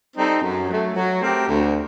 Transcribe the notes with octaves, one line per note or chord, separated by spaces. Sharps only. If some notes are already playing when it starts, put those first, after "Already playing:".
G3 C4 D#4 A4
F#2
F#3 A3
F#3
A3 C4 G4 A#4
D2